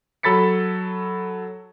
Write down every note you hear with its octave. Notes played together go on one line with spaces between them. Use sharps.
F#3 A4 B5 A6 B6 C#7